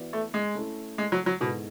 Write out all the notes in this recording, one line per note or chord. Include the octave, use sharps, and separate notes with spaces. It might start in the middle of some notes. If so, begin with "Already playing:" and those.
Already playing: E3 B3 F#4 B4 D5
A3
G#3
A3 C#4 E4 A4
G#3
F#3
F#3
G#2 B2 G#3 B3 E4 A4